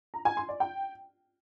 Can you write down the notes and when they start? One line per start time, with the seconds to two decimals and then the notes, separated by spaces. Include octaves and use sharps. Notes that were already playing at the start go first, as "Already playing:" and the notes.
0.14 A#5
0.25 G#5
0.37 C6
0.49 D5
0.60 G5